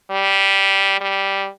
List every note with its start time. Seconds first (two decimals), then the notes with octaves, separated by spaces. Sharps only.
0.11 G3
1.01 G3